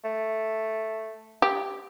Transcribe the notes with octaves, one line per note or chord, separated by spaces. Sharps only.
A3
G4